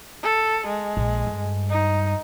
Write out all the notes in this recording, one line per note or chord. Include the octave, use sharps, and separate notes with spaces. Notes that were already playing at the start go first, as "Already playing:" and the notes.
A4
G#3
A#1
G2
D#4